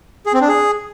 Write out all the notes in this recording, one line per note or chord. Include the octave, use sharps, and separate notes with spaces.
G#4
C4
D4
G#4